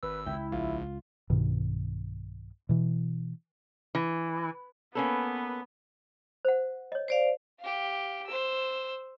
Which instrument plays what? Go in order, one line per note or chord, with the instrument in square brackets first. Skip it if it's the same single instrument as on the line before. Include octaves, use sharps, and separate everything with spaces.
[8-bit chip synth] G#1 E6 [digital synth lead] B4
[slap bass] C#2 [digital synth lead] E4 [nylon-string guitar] G5
[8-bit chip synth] A#1 [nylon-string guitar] F4
[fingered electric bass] B1 G2 B2 D#3
B2 E3
[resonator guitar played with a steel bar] E3
[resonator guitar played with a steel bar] A#3 C#4 A4 [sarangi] B3 [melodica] B4
[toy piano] C5 F#5
C#5 D#5
[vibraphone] C5 D5 F5
[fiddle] G4 F5
C5 E6